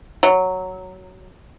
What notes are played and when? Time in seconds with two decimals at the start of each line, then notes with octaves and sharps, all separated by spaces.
0.23 F#3